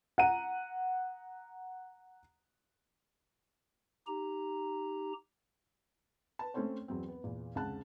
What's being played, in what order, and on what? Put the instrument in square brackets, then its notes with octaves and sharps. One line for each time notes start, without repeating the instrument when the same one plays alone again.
[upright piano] F#5 A#5 D#7
[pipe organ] D#4 G4 A#5
[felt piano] B4 A5
A3 C4 C#4 A4 C5 C#5
E2 F#3 C4
B3 B4
E2 A#2
F1 C#2 G#3 F#5 A5 F#6